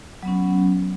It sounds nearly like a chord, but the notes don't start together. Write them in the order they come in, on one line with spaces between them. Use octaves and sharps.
F#3 B3 C#4